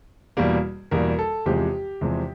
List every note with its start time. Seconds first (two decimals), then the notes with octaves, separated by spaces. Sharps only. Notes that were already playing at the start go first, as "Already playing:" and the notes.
0.37 E2 B2 G3 A#3
0.91 E2 B2 G3 A#3 A#4
1.19 A4
1.46 E2 C3 F3 G#3 G4
2.01 E2 C3 F3 G#3